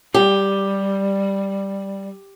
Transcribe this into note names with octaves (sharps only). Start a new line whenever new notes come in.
G3 G4